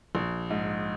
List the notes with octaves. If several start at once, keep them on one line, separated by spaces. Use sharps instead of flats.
A#1
G#2